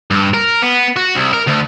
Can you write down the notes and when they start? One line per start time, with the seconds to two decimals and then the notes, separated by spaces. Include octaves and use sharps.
0.11 G2
0.34 A#4
0.62 B3
0.96 F#4
1.15 C2
1.33 A#4
1.47 D2